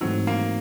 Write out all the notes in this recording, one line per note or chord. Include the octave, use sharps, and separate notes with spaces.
G#2 E3 F#3 A3 C4 D#4
A#3